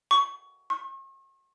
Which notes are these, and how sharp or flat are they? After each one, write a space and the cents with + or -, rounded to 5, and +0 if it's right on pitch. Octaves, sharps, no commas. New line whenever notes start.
C#6 +15
C#6 -45